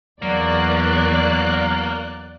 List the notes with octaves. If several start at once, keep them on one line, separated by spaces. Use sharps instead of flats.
E2 F#3 A#3 D5 F#6